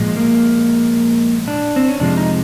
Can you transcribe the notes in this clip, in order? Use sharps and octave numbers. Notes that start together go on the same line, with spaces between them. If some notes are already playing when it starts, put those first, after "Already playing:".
Already playing: A#2 F3 G#3
A#3
D4
C4
C#4
F2 C3 F3 G#3 D4
D#4